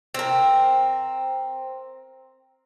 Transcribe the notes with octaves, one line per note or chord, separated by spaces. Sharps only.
C4 A#4